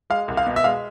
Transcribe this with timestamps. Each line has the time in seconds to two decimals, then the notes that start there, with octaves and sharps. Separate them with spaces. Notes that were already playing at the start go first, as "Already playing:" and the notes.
0.10 G#3 F5
0.28 C2
0.37 F5
0.46 B2
0.56 E5
0.64 G#3 F5